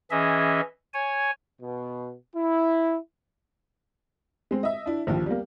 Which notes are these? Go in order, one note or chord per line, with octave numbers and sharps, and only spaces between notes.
E3 C#4 G#4 D#5 E5
C#5 G#5
B2
E4
G#3 C4
D#5 E5
D4 E4
A#1 D#2 F3
G3 A#3